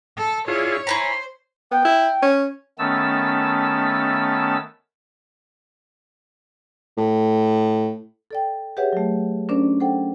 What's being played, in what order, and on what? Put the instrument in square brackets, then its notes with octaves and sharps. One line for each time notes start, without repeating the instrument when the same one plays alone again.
[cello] A4
[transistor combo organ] E4 F4 G#4 [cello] C#5 [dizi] D5
[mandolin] E4 G#5 A#5 [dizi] C5 [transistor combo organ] B5
[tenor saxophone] B3 [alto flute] G5
[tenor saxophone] E4
C#4
[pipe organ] D#3 A3 B3 C#4 A5 E6
[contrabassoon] A2
[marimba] A4 D5 G5
G4 G#4 B4 C#5 E5 F#5
F#3 A3
C#4 D4 A#4 C5 D5
A4 C5 F#5 G5